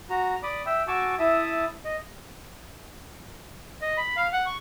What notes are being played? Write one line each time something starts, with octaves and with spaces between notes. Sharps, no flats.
F#4 A#5
D5 B5 D6 D#6
E5 G5 E6
F#4 G#5 A5 C#6 D6 E6
E4 E5 A5 D#6
D#5
D#5
B5
F5
F#5
C#6